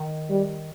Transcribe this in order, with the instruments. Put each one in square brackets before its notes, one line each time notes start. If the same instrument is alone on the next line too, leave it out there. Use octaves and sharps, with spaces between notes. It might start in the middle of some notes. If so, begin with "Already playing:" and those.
Already playing: [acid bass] D#3
[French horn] G3